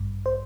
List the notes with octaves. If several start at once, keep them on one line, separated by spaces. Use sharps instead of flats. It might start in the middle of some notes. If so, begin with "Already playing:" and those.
Already playing: A1 G2
C5